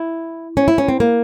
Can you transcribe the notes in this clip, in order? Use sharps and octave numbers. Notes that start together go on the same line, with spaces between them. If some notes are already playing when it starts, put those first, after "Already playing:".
Already playing: E4
C#4
E4
C#4
C4
A#3